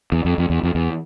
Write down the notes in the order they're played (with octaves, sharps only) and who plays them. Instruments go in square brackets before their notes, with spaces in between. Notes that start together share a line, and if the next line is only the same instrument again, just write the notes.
[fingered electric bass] E2
F2
F2
E2
F2
E2